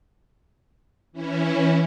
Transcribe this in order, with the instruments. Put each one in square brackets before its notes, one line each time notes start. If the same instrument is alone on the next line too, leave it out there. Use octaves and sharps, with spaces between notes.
[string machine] E3 C#4 E4